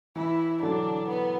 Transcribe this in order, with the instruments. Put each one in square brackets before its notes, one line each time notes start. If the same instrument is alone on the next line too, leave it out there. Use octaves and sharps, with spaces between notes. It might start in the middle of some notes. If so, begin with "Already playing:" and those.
[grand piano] E3 [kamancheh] E4
[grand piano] D3 F#3 [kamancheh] D4
[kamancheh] B3